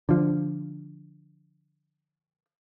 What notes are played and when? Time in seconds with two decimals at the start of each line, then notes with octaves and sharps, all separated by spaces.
0.09 D3 F3